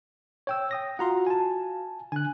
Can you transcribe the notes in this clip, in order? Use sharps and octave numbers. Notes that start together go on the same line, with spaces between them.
C#5 G5 E6
G5 D#6 A#6
F4 F#4 F5 F#5 A#5 C6
G#5 A5
D3 G#5 F#6